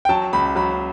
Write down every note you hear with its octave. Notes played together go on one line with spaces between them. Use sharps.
G5
F#3 A5
C#2 B5
F#3 B5